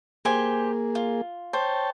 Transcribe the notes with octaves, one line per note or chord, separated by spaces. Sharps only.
A#3 G4 G#4 C5 G#5
F4
C5 C#5 G5 A5